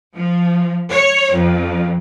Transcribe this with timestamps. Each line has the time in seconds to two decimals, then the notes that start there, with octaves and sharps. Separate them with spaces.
0.14 F3
0.89 C#5
1.32 F2